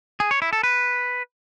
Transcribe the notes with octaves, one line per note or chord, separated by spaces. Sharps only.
G#4
C#5
E4
A4
B4